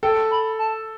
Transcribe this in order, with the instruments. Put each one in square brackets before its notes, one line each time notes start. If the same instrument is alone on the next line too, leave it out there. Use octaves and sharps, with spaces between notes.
[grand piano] A4 [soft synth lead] G5
[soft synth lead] B5
A5